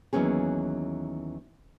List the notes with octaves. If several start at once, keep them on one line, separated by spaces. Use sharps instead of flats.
D#2 E3 F#3 B3 C#4 G#4